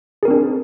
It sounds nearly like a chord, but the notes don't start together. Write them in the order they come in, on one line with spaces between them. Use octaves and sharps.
G#4 A#4 C4 D4